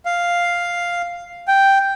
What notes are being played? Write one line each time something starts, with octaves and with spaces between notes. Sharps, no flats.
F5
G5